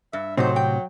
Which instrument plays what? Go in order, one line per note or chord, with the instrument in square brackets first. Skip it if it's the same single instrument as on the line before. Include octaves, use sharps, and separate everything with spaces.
[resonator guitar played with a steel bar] G2 [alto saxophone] E5
[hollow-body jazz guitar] A2 C3 C4 [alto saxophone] F#3 [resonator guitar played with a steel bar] D#4 C5
[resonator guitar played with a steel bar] G5